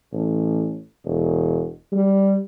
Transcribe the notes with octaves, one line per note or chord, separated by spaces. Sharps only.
A1
E1
G3